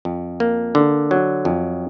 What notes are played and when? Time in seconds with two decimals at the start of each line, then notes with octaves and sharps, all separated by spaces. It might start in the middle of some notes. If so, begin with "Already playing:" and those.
0.05 F2
0.40 A#3
0.75 D3
1.11 F#3
1.45 F2